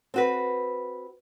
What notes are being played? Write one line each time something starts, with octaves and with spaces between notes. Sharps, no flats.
C4 F#4 B4